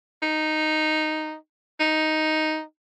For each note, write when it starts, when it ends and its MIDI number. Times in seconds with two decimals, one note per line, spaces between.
0.22 1.34 63
1.80 2.62 63